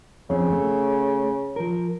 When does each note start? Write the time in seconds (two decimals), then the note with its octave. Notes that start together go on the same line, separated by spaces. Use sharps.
0.30 F2 C#3 C4
0.52 A3
1.56 F3 A#4